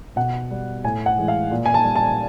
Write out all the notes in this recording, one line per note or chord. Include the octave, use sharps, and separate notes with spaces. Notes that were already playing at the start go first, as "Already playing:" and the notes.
B2 F#5
G3
A2 G#5
F#5
E3 G#3
F5
A#2
G#5
A5
G3
A5